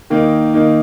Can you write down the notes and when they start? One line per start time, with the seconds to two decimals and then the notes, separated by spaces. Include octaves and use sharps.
0.10 D#3 A#3 D#4
0.54 D#3 A#3 D#4